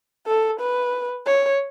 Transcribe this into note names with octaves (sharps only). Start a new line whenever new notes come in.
A4
B4
C#5